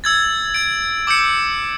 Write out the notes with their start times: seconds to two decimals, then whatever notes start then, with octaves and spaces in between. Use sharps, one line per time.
0.04 E6 G#6 A6
0.54 G#6 D7
1.07 D6 E6 G6 C#7